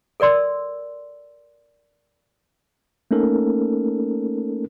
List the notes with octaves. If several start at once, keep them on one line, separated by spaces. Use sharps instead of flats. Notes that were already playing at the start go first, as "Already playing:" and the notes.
A4 A#4 D5 C6 E6
A3 A#3 C#4 D#4 A4 A#4